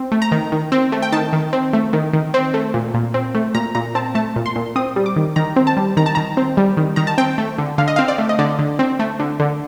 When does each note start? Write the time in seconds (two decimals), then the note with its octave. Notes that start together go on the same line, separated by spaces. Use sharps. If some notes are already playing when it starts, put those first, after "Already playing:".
Already playing: C4
0.12 A3
0.22 A#5
0.32 D#3
0.52 D#3
0.72 C4
0.92 A3
1.02 G5
1.12 D#3 A5
1.33 D#3
1.53 C4
1.73 A3
1.93 D#3
2.13 D#3
2.34 C4
2.54 A3
2.74 A#2
2.94 A#2
3.14 C4
3.35 A3
3.55 A#2 A#5
3.75 A#2 A#5
3.95 C4 A5
4.15 A3 A5
4.36 A#2
4.46 C6
4.56 A#2
4.76 C4 D#6
4.96 G3
5.06 D6
5.16 D#3
5.36 D#3 A#5
5.56 C4
5.67 A5
5.77 G3
5.97 D#3 A#5
6.06 A5
6.15 D#3 A#5
6.37 C4
6.57 G3
6.77 D#3
6.96 D#3 A#5
7.07 A5
7.18 C4 G5
7.38 A3
7.58 D3
7.78 D3 F5
7.88 D#5
7.96 C4 F5
8.08 D5
8.18 A3
8.29 D#5
8.39 D3 D5
8.59 D3
8.79 C4
8.99 A3
9.19 D3
9.40 D3